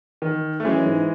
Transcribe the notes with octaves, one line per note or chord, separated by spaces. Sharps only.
D#3
A3
F#2 E3 G#3
G#2